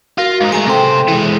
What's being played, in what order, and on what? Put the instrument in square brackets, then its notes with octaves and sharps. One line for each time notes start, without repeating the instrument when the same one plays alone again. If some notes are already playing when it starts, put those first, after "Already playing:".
[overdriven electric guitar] F4 [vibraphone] F#4 A#4
[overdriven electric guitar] G#2 D#4
[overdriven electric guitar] G#3 A3 [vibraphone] G#5 A#5
[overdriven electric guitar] C3 C5 [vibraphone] A4 G5
[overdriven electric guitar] E3 G#3